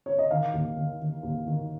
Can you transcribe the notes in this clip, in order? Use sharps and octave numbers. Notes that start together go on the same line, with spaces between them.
C#5
D#5
D#3 F5
D#2
D#3
D#3
D#2
D#3